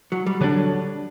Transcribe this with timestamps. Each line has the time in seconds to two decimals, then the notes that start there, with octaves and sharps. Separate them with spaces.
0.12 F#3
0.26 G3
0.41 D3 F#3 A3 D4